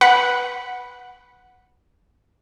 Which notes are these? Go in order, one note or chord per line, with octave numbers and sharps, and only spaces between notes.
B4 F#5